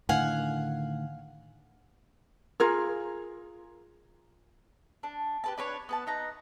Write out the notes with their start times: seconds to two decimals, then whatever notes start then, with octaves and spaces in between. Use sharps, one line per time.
0.09 A2 D3 D#3 F5 F#5 G#5
2.60 F4 G#4 A#4
5.03 D4
5.44 G4 B4 A5
5.58 D4 B4 C#5
5.89 B3 B4 A5
6.07 D#4 B4 A#5